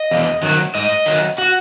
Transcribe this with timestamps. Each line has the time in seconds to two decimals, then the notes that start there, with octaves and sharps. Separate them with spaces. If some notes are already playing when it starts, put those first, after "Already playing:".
Already playing: D#5
0.11 E2
0.43 D#3 F#3
0.75 G#2 D#5
1.06 D#3 F#3
1.38 F#4